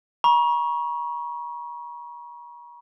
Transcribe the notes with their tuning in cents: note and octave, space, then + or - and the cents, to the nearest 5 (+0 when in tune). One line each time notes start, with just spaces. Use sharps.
A#5 +45 C#6 +0